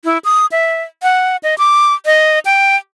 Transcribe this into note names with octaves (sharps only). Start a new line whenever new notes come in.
E4
D#6
E5
F#5
D#5
D6
D#5
G5